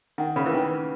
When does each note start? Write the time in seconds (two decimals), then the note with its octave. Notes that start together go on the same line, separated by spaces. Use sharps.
0.18 D#3 F#5
0.36 C#3 B5
0.46 E3
0.53 D#3 B4
0.71 B4